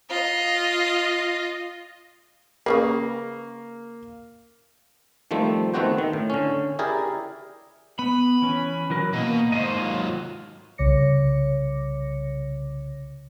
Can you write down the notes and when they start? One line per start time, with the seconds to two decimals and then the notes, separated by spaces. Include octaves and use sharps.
0.10 F4 D#5
2.66 C#3 G#3 A#3 B4
5.31 D#3 F3 G3 A3 C4
5.74 D#3 A3 B3 C4 F#4 C5
5.98 D#3
6.13 A2
6.30 D3 C#4
6.79 E4 G4 G#4 A#4 D5
7.99 B3 B5
8.42 E3 C#4
8.90 E3 F#3 A#4
9.14 B2 A#3 D#5
9.52 D#2 G#2 C5 D#5
9.79 F#3 F4
10.78 C2 C#3 C#5 D6 A#6 C#7